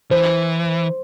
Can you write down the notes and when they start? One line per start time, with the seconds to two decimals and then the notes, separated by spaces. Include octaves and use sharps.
0.11 E3 C5